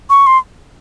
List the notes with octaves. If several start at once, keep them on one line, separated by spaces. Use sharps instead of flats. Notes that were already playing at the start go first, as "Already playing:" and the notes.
C#6
C6